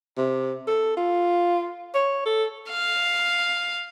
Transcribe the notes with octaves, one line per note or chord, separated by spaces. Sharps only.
C3
A4
F4
C#5
A4
F5